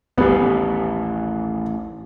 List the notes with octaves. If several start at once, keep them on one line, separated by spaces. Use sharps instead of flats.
A1 D#2 A2 G3 B3